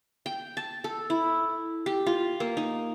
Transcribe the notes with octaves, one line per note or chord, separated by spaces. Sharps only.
G5
A5
A4
E4
G4
F4
A#3
D#4